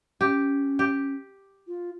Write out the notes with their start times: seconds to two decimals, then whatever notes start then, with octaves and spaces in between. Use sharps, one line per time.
0.21 C#4 G4
0.79 G4
1.67 F4